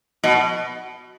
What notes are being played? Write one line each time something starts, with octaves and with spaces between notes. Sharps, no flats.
B2